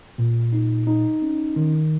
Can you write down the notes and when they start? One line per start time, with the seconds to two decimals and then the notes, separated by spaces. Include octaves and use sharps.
0.18 A#2
0.53 D#4
0.87 D#4
1.22 C#4
1.56 D#3